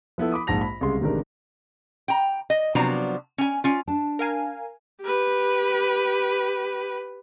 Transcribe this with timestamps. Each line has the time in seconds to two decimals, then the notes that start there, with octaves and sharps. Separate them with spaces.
0.18 F3 B3 E4 A4
0.32 B5 D6 D#6
0.47 A#1 G#2 A5 A#6 F7
0.61 B5
0.81 C2 C#3 G#3 C6
1.01 A1 C3 D#3 G#3 D4 A#4
2.08 G5 A#5
2.50 D#5
2.75 C3 F3 F#3 B3 D4 A#5
3.38 C#4 G#5
3.64 C#4 F4
3.87 D4 A5
4.19 A#4 F5 G#5
5.01 G4 B4